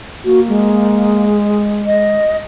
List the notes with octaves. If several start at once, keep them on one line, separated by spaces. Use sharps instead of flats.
A#3 F#4
G#3
D#5